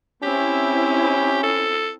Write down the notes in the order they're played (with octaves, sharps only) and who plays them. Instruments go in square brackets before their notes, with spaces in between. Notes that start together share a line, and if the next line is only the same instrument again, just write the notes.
[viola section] C4 E4 [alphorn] C#4 [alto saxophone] G4
[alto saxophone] A4